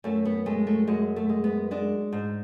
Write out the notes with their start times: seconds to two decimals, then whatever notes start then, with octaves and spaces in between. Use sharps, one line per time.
0.04 F#2 A3
0.25 B3
0.46 G#3 A3
0.67 A3
0.87 F#2 G#3
1.16 A3
1.29 G#3
1.44 B3
1.71 G#3 D4
2.12 G#2